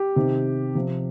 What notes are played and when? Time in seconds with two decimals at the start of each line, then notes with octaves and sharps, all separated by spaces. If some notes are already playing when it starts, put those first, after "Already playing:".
Already playing: G4
0.16 C3 D#3
0.75 C3 F3